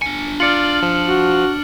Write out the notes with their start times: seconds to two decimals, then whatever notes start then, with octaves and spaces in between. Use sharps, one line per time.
0.02 D4 G#5 C#7
0.40 F4 D5 F6 C#7 F#7
0.82 F3
1.07 F#4